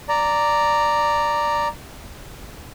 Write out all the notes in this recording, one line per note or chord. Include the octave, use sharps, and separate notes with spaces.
D5 A#5